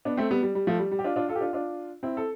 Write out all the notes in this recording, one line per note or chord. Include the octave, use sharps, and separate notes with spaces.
B3 D4
A3 C4
G3 B3
G3
G3
F3 A3
G3
G3
G4
D4 F4
D4 F4
F4 A4
G4
D4 F4
D4 F4
C4 E4
A4